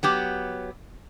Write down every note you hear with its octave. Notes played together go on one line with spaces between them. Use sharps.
F#3 B3 G4